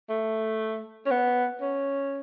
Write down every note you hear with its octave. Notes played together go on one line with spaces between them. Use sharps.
A3
C#4
B3
C#4